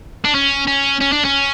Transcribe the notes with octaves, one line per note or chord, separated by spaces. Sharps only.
D4
C#4
C#4
C#4
D4
C#4